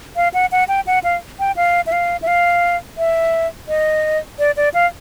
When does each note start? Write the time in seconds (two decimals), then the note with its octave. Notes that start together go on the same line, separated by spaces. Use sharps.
0.16 F5
0.34 F#5
0.52 F#5
0.68 G5
0.87 F#5
1.04 F5
1.39 G5
1.56 F5
1.87 E5
1.92 F5
2.22 E5
2.27 F5
2.98 E5
3.68 D#5
4.39 D5
4.57 D5
4.74 F5